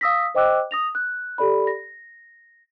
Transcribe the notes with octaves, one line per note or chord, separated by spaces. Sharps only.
F5 D#6 E6 A#6 B6
C5 D#5 G5 D6 E6 F#6
D#6 A#6 F7
F#6
G4 A4 D5 B5
A#6